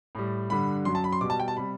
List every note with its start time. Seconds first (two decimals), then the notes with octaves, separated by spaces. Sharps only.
0.15 A2 G3
0.50 G2 D3 G3 B5
0.85 F#2 F#3 C6
0.95 A5
1.04 B5
1.13 C6
1.21 B2 G3 D6
1.30 A5
1.40 G5
1.48 A5
1.57 C3 G3 B5